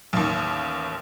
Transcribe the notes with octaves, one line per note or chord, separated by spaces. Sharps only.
A1 D#2